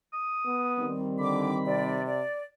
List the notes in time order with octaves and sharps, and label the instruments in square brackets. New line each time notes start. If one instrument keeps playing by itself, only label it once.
[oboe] D#6
[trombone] B3
[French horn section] D#3 G3 C4
[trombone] D3 [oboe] B5 [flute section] D6
[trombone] C3 [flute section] D5
[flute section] D5